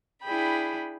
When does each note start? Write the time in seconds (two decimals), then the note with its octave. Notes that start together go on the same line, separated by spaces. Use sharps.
0.23 D4 E4 G#4 G5 B5